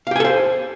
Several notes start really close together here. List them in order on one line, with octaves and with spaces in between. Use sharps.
F5 G4 G#5 A4 C5